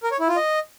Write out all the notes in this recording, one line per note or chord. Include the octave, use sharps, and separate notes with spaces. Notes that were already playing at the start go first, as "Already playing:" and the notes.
A#4
C#5
E4
F4
D#5